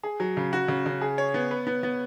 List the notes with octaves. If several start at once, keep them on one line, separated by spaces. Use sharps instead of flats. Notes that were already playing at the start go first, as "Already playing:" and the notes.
G#4
F#3
C#3
F#4
C#3
C#3
G#4
C#5
B3
B4
B3
B3